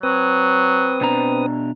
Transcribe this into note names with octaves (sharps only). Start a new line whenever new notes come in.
F#3 C4 B4 D#6
B2 D4 A#5